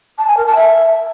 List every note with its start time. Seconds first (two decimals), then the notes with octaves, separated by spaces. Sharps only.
0.18 A5
0.28 G#5
0.37 A#4
0.46 A5
0.56 E5